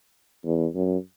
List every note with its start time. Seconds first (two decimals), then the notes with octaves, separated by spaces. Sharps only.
0.45 E2
0.75 F#2